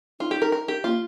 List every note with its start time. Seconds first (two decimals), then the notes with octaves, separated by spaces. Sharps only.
0.20 D#4 F4
0.31 G4
0.42 A#4
0.52 A#4
0.68 G4
0.84 A#3 F4